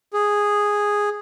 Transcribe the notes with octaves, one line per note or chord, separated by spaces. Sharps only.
G#4